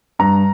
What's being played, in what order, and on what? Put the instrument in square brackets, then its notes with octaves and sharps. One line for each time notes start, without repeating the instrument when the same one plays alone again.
[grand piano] G2 A#5